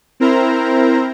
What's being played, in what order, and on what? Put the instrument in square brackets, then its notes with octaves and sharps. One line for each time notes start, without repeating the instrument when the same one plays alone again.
[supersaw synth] C4 E4 A#4 C5 A#5